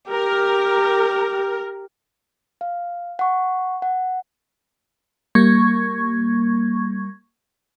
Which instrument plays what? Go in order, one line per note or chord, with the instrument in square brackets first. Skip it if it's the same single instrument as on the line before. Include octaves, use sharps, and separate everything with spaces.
[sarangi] G4 [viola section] A#4
[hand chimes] F5
F#5 C#6
F#5
[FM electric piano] G3 A#3 C#6 G#6